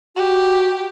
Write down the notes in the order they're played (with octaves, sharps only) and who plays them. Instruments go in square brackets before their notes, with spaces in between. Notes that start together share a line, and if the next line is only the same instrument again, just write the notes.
[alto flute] F#4 [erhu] G4